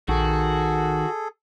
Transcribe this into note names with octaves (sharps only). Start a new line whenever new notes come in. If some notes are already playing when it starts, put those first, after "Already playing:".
A#1 D#3 F#4 G#4 A4